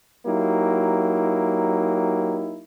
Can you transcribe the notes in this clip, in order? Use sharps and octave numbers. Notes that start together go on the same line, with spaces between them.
F#3 A#3 D#4 E4 G4